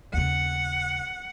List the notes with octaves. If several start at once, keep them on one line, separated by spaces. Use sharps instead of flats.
D#2 C#3 F#5